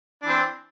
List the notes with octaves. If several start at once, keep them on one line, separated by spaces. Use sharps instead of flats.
E3 C4 D4